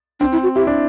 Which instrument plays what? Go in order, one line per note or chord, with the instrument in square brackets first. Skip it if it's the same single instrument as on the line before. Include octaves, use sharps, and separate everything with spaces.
[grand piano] C4 [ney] D4
[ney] E4
F#4
[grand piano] E4 [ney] G4
[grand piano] D4